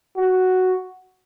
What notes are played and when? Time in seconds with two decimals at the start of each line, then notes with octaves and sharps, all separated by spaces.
0.17 F#4